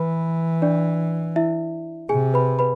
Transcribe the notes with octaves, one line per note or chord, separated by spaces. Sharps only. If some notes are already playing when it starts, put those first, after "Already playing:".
Already playing: E3 B4 B5
D4 D5
E4 E5
C3 G#4 G#5
B4 B5
B4 B5